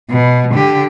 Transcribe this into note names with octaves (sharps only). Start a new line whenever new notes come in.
B2
D3 G4